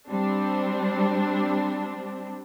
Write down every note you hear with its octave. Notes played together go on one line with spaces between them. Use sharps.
G3 C4 D4